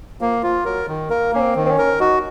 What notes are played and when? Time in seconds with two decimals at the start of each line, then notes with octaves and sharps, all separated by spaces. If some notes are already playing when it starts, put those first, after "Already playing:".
0.20 F3 A#3
0.42 F3 F4
0.65 F#3 A#4
0.88 D#3
1.10 A#3 A#4
1.33 A#3 C#4
1.40 C4
1.55 D#3
1.66 C4
1.70 C#4
1.78 A#4
2.00 D#4 F#4